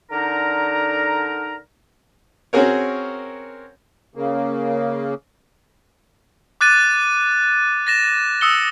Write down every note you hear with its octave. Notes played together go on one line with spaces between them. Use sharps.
D3 D#4 A#4 A#5
C4 C#4 F#4 G#4 A#4 C#5
C#3 A#3
D6 F#6 A6 D#7
A6 A#6 E7
D#6 E6 C#7 G7